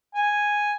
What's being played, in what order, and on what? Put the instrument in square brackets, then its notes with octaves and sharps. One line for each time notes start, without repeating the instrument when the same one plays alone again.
[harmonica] G#5